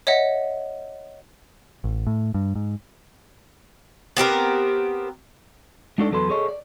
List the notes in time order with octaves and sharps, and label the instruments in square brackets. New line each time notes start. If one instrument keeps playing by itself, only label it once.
[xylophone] C#5 D#5 E5 F#5
[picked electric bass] A1
A2
G2
G#2
[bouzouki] B3 C4 G4 A#4
[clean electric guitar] G#3 D4 D#4 F#4 A4 D5
E2 F#3 A4 B4 C6
G#4 A4 C#5 D#5
D5